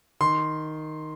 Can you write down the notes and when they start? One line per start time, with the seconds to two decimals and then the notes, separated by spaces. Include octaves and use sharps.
0.20 D#3 C6